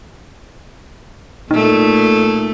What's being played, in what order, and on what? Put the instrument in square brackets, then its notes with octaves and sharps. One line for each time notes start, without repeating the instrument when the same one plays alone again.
[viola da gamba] A#2 A3 [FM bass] D#4